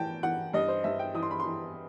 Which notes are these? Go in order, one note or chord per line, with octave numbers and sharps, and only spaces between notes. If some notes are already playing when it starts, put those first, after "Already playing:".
Already playing: A2 E3 G5 A5
E3 F#5
G2 D#5
C5
G2 E5
G5
E3 D#6
C6
B5
C6
E3